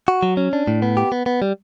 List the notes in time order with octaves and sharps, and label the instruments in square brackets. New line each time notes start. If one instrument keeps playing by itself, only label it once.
[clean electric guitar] F#4
F#3
C#4
D4
A2
B3
G4
B3
B3
G3